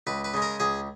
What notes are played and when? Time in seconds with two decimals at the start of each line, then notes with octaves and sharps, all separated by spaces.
0.07 C#2 B4
0.24 B4
0.34 C#3 G#3
0.42 A#4
0.60 C#2 G#4